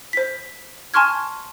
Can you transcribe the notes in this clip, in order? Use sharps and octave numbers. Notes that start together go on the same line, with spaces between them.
C5 B6
G#5 A5 C6 C#6 F6 G#6